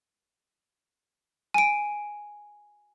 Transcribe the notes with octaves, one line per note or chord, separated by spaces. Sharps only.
G#5 D7